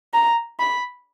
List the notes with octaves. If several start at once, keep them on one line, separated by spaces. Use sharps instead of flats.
A#5
B5